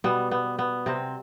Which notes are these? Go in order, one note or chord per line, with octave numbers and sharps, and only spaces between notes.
B2 G3 B3
B3
B3
C3 C4